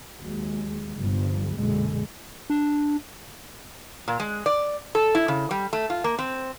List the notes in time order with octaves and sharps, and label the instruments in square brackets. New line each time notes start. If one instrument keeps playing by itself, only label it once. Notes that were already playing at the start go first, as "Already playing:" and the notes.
[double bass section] D#2 F#3 G#3
G1 C2 G2 F3
A#1 F#2 B2 D3 G#3
[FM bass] D4
[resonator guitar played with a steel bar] A#2
G#3
D5
A4
E4
C#3
G3
A3
F4
A#3
C4